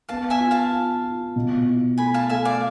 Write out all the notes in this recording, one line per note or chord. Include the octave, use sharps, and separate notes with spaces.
B3 F5 A5
E5 G#5
F4
F5 A5
F4
F4
B2
E4
A3 G#5 B5
F5 A5
A3 E5 G#5
D5 F5